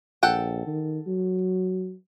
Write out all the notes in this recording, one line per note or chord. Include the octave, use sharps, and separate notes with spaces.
A#1 A4 F#5 G5
D#3
F#3